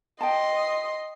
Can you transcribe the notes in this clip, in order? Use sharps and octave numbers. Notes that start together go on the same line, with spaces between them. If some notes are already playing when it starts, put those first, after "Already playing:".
D#5 G5 A5 C6